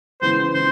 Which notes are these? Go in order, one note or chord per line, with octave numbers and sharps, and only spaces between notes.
C#3 E3 G#3 B3 C5
C#3 E3 C5